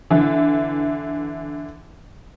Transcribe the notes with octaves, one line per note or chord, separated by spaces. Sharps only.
D3 E3